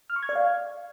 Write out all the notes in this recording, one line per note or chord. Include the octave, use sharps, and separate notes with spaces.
F6
C#6
G#6
D5
F5